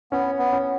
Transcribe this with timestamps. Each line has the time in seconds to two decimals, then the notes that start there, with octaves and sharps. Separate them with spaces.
0.12 B3 C#4
0.39 B3
0.52 C#4